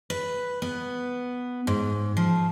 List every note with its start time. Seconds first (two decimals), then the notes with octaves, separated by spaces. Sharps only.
0.10 B4
0.62 B3
1.67 G#2
2.17 F3